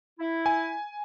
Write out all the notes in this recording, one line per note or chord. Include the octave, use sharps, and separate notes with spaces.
E4
G#5